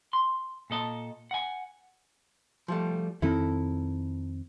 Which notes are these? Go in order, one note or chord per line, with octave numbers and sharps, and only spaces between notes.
C6
A#2 A4 D#5 A5
F#5 G#5
F3 G3 A3
F2 D#3 C4 E4 A4